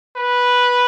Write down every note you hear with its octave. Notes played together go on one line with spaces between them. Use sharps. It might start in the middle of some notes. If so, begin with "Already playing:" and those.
B4